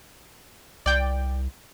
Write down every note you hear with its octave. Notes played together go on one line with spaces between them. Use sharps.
C2 D5 G5